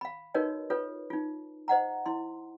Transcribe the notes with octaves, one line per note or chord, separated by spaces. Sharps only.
F5 B5
D#4 F#4 A#4 B4 C#5 D#5
F4 A4 B4 C#5
D#4 F4
C5 D#5 F#5 A#5
E4 C6